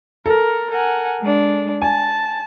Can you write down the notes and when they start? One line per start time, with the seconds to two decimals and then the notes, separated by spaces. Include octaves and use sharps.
0.26 A4 A#4
0.71 A#4 F#5 G#5
1.21 G#3 D4
1.82 G#5 A5